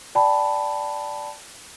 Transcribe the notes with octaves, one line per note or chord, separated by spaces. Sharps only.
D5 G5 A5 B5